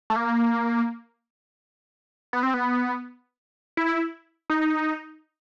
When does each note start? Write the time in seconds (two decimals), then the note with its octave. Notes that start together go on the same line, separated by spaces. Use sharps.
0.10 A3
0.16 A#3
2.33 B3
2.43 C4
2.54 B3
3.77 E4
4.50 D#4